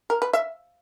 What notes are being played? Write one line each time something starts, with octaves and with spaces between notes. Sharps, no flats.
A#4
B4
E5